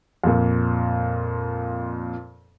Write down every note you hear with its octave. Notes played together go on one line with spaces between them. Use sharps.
F2 A#2